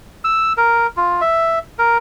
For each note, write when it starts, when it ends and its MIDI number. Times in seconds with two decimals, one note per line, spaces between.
0.24 0.53 88
0.57 0.87 70
0.97 1.21 65
1.21 1.59 76
1.79 1.98 70